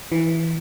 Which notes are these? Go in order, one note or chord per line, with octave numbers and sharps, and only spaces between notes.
E3